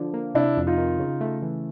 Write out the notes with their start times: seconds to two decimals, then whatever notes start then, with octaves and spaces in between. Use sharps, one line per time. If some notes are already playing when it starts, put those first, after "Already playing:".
Already playing: D3 F3
0.14 A#3
0.35 C3 D4 E4
0.57 F2
0.67 D#4 F4
0.78 D#3
0.99 C#3
1.21 A3
1.42 E3